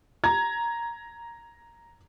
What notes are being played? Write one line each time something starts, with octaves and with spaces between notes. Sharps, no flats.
A#5 G#6